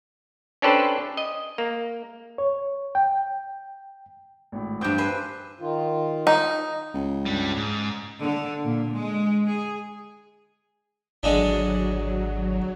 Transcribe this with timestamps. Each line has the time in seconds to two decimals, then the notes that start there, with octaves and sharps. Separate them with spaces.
0.62 C#4 D4 G4 A4 B4 C5
1.17 D#5
1.58 A#3
2.38 C#5
2.95 G5
4.52 G#1 A2
4.81 G2 C4 D6 G6 D7
4.98 B4 C5 G#5
5.60 D#3 F4
6.27 D#4
6.94 C#2
7.26 G3 D4
7.57 G#2
8.21 D3
8.65 A#2
8.95 G#3
9.47 G#4
11.23 G#1 D3 F#3 G#3 D4